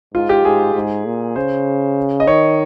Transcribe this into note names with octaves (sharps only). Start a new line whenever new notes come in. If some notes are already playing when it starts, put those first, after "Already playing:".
G#2 F4
G4
G#2 G#4
G#2
A#2
C#3 C5
D#5
D#3 C#5